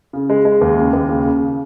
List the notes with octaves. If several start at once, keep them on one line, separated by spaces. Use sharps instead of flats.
C#3
G#3
G#3
D#2
C#3
D#2
C#3
C#3